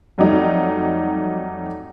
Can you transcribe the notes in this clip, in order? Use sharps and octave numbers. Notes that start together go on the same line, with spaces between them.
F2 F#3 G3 A3 D#4